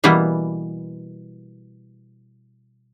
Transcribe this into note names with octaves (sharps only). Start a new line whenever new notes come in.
B2 E3 G3 A#3 B3